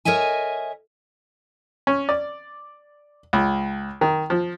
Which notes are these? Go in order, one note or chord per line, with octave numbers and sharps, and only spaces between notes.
A#4 C#5 D#5 E5 G#5
C#4
D5
C#2
D#3
F3